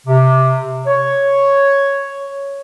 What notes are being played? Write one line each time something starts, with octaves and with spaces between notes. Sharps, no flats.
C3
C#5